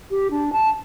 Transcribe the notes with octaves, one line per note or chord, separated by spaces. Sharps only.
G4
D4
A5